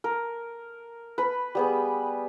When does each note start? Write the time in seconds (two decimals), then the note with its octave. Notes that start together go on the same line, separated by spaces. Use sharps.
0.04 A#4
1.18 B4 B5
1.55 G3 B3 G#4